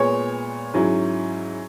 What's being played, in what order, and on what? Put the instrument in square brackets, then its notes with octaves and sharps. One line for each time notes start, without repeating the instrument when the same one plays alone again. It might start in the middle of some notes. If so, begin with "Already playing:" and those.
Already playing: [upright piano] A#2 G#3 B3 [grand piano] C#5
[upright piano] G#2 F#3 C#4 E4